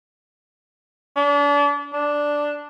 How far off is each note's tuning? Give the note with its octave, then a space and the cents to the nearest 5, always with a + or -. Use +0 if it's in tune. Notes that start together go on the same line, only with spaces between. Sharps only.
D4 -35
D4 +0